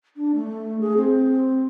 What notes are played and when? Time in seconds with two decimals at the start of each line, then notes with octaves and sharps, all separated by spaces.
0.16 D4
0.35 A3
0.81 G#4
0.97 C4